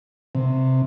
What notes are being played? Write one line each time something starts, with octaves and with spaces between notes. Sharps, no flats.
C3